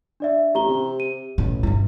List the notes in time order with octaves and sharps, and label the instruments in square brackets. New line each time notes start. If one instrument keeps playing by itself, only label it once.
[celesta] D4 D5 E5
[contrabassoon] A1 [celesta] G4 A#5 G7
[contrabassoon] C3
[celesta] D#7
[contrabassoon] A1 [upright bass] B2
[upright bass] G2 B2 [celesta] E4